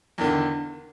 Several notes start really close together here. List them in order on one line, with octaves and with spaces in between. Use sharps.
E2 D#3 D3